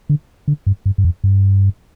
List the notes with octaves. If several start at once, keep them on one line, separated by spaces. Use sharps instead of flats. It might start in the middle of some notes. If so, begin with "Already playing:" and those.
D3
D3
G2
G2
G2
F2
G2